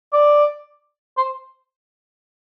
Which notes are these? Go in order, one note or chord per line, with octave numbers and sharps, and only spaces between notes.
D5
C5